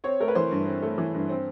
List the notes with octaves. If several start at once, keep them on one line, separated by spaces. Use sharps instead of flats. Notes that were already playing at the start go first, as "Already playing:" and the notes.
C4 C#5
A3 A#4
B4
E3 C5
G2
C4
A3
E3
G2
C4